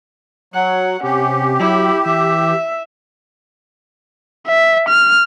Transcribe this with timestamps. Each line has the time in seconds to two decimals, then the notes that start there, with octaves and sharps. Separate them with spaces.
0.54 F#3 F#5
1.03 C3 C#4 G4
1.60 F#3 E4
2.06 E3 E5
4.47 E5
4.89 F6